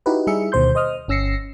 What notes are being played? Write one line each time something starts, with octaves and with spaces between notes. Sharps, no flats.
D#4 E4 F#4 G4 B4
G3 D#4 E4 G#4 E5 C#7
D2 B2 D#3 C5 C6 G6
C5 D#5 D#6 F6
G1 C#4 E6 A#6 C7 C#7